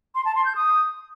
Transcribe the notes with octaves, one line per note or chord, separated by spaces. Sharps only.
C6
A5
C6
G6
D#6